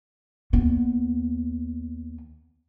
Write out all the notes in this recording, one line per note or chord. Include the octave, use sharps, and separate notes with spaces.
D#2 B3